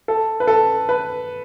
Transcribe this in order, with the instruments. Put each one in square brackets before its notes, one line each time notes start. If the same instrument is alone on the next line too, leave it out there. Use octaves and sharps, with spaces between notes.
[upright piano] A4
B4
A4
B4